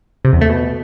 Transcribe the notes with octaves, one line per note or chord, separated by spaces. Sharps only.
C3
E2
A3
B2